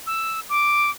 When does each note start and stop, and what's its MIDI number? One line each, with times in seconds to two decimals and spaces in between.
0.07 0.40 88
0.49 0.91 86